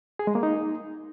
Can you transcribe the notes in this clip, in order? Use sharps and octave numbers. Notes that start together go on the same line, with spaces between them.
G#4
G#3
A#3
D#4